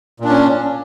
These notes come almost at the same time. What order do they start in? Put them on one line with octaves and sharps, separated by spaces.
A#2 D4 C#4